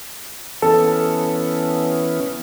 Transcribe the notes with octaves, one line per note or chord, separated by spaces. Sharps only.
E3 B3 C#4 A4